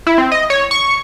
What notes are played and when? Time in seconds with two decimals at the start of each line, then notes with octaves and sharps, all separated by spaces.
0.07 E4
0.18 C4
0.32 D#5
0.50 C#5
0.71 C#6